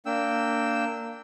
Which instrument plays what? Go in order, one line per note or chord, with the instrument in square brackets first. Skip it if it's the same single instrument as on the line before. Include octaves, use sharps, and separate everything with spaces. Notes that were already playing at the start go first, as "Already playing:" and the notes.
[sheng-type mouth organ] A#3 D4 G5 E6